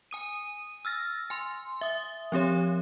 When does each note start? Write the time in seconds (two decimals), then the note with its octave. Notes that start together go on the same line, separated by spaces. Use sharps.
0.11 G#5 D#6 D#7
0.85 E6 F6 A6 A#6
1.30 G#5 C6
1.81 E5 D#6
2.32 F3 C4 G4 C#5